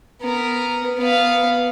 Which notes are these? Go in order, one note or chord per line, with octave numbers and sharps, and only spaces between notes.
B3 A#4
B3 F5